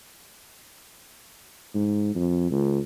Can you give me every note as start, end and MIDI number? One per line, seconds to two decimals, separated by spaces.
1.74 2.12 44
2.15 2.46 41
2.51 2.79 37